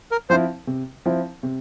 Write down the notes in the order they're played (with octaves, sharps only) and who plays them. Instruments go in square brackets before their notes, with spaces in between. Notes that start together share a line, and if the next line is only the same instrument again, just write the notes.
[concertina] A#4
[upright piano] F3 C4 E4 [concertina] C5
[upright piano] C3
F3 C4 E4
C3